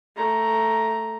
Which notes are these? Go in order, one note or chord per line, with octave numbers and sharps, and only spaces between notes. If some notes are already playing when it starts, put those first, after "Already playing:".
A3 A#5